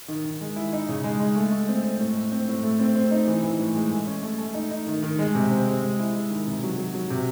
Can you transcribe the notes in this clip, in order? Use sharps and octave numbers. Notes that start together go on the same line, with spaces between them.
D#3
D#3
G#3
E4
D#4
C#3
G#3
G#3
A3
A3
C4
C4
A2
A3
C4
A2
A3
C4
C4
D#4
E3
E3
A2
G#3
A3
C#4
A3
A3
D#4
D#4
D#3
D#3
G#3
C3
C4
G#3
G#3
E4
G#3
D#3
C3
F#3
F#3
F#3
C3